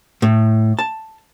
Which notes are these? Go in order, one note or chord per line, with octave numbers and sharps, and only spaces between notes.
A2
A5